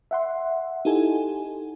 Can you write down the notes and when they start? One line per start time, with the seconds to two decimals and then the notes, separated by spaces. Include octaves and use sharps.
0.11 E5 F#5 C6
0.85 D#4 E4 G4 A4 G#5